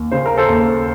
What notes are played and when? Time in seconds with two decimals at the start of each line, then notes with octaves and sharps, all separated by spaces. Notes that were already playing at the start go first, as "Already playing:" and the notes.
Already playing: D#2
0.12 C#3 C5
0.26 A#4
0.38 A4 C5
0.49 D#2